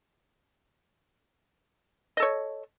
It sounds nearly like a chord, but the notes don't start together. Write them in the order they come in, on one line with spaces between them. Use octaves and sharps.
D#5 A4 C#5